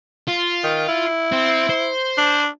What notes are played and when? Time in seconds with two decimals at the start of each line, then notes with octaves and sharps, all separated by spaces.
0.28 F4
0.63 D#3
0.88 E4
1.32 C4
1.69 C5
2.18 D4